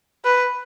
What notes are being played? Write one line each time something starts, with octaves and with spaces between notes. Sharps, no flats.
B4